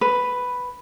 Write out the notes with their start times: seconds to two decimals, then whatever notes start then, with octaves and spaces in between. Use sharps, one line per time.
0.01 B4